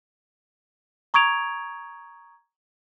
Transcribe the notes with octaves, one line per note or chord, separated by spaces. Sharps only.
A#5 C#6 D#6 G#6 D7 F7